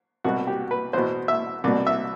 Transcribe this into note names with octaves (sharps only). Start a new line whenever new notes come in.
C2 B2 F#4
G4
B4
E2 B2 C5
E5
C2 B2 D5
E5